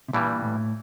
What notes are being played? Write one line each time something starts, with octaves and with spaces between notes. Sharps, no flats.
C3
G2 A#2 E3 G3
A2